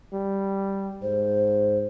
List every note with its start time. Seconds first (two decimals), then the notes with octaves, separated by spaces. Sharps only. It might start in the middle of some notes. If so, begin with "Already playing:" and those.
0.13 G3
1.02 G#2 C5